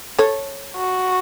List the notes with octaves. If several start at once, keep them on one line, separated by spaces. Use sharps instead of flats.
A4 C#5
F#4